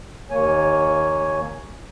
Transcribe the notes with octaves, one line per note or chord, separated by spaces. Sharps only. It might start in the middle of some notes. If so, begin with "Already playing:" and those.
D#2 A#3 C#5 G#5